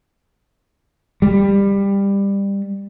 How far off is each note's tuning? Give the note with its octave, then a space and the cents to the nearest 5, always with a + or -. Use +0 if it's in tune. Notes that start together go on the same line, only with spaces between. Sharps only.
G3 +20